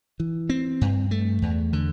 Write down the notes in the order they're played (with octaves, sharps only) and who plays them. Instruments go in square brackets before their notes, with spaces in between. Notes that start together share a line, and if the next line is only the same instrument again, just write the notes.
[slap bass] E3
C4
G2
A3
E2
D3